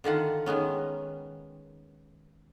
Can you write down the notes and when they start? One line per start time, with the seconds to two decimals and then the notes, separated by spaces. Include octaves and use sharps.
0.04 D3 D#3 F4 F#5
0.46 D#3 G#3 B3 C#4